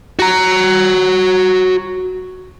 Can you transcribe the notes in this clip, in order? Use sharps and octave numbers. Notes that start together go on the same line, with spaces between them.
F#4 A#5